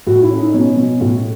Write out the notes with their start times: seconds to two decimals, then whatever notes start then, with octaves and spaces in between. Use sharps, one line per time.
0.07 A2 F#4
0.22 E4
0.30 C#4
0.38 D#4
0.54 B2 C#4
0.77 B2
1.01 A2